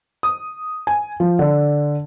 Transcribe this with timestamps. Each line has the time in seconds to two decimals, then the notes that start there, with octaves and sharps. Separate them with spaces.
0.23 D#6
0.87 G#5
1.20 F3
1.39 D3